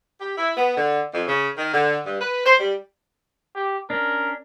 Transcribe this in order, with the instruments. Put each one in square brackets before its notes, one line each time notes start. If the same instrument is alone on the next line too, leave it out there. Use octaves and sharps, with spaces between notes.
[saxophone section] G4
E4
B3
D3
F2
C#3
D#3
D3
G2
B4
C5
G3
[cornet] G4
[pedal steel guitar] C#4 D4 [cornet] A#4